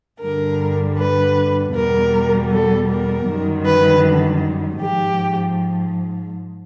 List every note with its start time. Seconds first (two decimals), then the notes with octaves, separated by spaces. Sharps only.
0.19 G2 D3 G3 A#4
0.96 B4
1.73 E2 B2 G3 A#4
2.50 A4
2.89 A#4
3.27 F#2 D#3 G3
3.65 B4
4.79 G#2 F3 G4